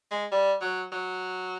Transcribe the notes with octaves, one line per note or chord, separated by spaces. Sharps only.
G#3
G3
F#3
F#3